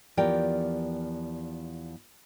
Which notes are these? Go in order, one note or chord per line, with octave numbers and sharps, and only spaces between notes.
E2 F3 G4 A#4 D5 G5